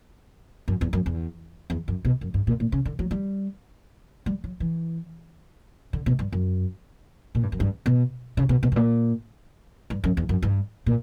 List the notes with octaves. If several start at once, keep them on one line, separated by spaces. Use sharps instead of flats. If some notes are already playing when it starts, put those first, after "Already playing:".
F#2
E2
F#2
E2
E2
F#2
B2
F#2
G2
A#2
A#2
C#3
D3
F#3
G3
G3
F#3
E3
D3
B2
G2
F#2
A#2
G2
F#2
G2
B2
C#3
B2
B2
G2
A#2
G2
F#2
E2
F#2
G2
A#2